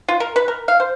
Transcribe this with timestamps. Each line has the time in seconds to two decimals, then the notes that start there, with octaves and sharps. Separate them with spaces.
0.08 F4
0.20 A#4
0.36 B4
0.48 A#4
0.68 F5
0.80 C5